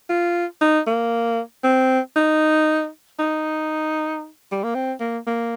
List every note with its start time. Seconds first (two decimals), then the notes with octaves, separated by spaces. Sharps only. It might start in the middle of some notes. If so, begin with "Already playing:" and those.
0.09 F4
0.61 D#4
0.87 A#3
1.64 C4
2.16 D#4
3.19 D#4
4.52 G3
4.63 A#3
4.75 C4
5.00 A#3
5.27 A#3